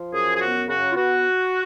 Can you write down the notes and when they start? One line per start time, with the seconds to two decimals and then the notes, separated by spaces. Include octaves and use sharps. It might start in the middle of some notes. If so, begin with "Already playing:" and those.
Already playing: F3
0.12 F#2 G#4
0.35 G#4
0.40 B3 F#4
0.68 C#3 F#4
0.91 F4
0.95 B3 F#4